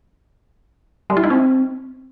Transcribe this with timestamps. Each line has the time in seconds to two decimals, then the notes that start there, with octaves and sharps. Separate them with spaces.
1.10 G3
1.17 E4
1.23 D#4
1.30 C4